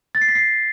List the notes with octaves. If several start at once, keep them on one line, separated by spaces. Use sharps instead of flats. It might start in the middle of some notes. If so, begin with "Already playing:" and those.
A6
C7
B6
C7